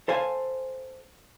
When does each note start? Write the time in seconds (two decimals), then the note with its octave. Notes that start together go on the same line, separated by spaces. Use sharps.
0.08 A4 C5 F5 G#5